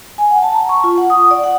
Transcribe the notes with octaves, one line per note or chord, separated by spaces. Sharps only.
G#5
F#5
A5
A#5
C#6
F4
F#5
D#6
D5
F#5